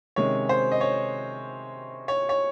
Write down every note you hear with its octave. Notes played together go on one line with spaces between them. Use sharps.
C3 D#3 G#3 C#4 C#5
C5
D#5
C#5
C#5
C#5